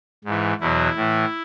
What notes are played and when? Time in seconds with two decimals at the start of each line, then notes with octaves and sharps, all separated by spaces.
0.24 G#2 E3
0.60 E2 B2 F#3 E4
0.96 A2 E3